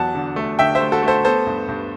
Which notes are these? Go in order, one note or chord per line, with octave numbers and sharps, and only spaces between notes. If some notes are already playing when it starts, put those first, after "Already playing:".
Already playing: E2 F#3 F#5 A5
D3
A3
D3 E5 G5
C5 E5
A3
F#4 A4
A3
A4 C5
B3 A4 C5
G2
G2